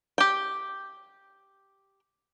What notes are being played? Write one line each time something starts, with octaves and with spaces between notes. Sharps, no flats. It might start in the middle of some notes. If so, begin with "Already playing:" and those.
G4 G5